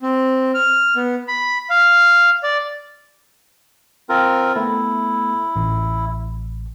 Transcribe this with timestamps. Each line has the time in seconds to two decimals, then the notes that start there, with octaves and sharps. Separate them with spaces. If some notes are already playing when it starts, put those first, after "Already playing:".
0.02 C4
0.54 F6
0.96 B3
1.28 B5
1.70 F5
2.43 D5
4.09 C4 F4 A#4
4.55 A3 B3 E4 A4
5.56 A1